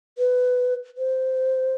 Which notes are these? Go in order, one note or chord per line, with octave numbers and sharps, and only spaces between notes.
B4
C5